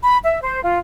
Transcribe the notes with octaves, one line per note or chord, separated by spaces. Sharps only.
B5
E5
C5
F4